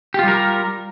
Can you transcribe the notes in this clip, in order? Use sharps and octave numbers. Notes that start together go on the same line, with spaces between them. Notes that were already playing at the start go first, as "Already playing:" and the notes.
G3 F4 G4 A#4